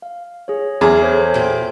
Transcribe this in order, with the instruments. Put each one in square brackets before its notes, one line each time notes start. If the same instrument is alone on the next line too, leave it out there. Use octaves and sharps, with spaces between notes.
[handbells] F5
G#4 C#5
[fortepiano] E2 [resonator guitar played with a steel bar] G#4 [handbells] F6
[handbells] A4 C5 C#5
[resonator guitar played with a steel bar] A#2 G4